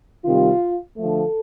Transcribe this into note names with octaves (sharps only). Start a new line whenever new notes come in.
C3 D#3 G3 F4
D3 F3 A3 A4